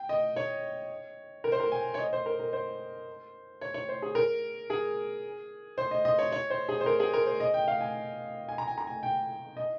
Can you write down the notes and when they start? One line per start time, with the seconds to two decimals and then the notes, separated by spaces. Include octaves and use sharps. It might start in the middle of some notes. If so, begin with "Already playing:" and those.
Already playing: G5
0.09 D#5
0.36 C#5
1.44 A#4
1.52 C5
1.60 A#4
1.72 G#5
1.94 C#5
1.99 D#5
2.13 C5
2.26 A#4
2.40 A#4
2.53 C5
3.61 C#5
3.74 C#5
3.89 C5
4.02 G#4
4.15 A#4
4.70 G#4
5.78 C5
5.91 D#5
6.05 D#5
6.19 C#5
6.32 C#5
6.50 C5
6.69 G#4
6.81 C5
6.86 A#4
7.00 G#4
7.13 A#4
7.26 C5
7.40 D#5
7.54 G5
7.68 F5
7.81 G#5
8.49 G#5
8.58 A#5
8.68 G#5
8.78 A#5
8.87 G#5
9.03 G5
9.57 D#5